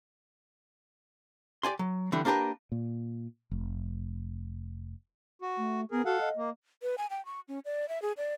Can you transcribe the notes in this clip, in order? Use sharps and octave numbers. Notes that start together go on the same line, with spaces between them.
G4 D5 G#5 C6
F#3
D3 E3 G3 B3
A#3 D4 G4 A#4 B4
A#2
F1
F#4
A3
B3 G#4 A#4
F#4 A4 F5 F#5
D#5
A#3
B4
G#5
G5
C#6
C#4
D5
E5
G#4
D5